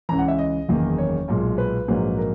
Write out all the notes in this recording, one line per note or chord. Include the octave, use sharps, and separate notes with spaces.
C#2 C#3 E3 A#5
F#5
E5
D#5
F#1 E2 D#3 A#3
C#5
B1 A#2 G#3
B4
A#1 G#2 F#3 A#3
A#4